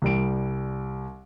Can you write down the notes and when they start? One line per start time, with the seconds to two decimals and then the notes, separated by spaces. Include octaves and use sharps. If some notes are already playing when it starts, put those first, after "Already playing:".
0.02 C2 G3 D7